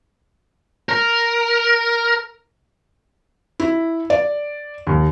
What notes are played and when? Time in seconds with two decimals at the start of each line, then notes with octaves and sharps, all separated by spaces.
0.89 A#4
3.60 E4
4.10 D5
4.87 D#2